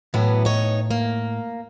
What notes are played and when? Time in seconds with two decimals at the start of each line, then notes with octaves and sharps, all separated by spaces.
0.14 A2 E3 F#3 B3
0.45 D#4 C#5
0.91 A#3